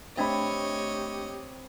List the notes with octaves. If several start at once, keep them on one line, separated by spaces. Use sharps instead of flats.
A3 C4 D4 G4 C#5 D#5 E5 B5